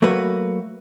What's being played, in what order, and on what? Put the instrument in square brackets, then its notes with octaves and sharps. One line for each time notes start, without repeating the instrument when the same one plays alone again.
[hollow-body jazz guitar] F#3 A3 A#3 F#4 B4